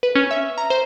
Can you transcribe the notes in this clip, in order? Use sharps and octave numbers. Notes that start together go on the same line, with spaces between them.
B4
C#4
E5
A#5
C5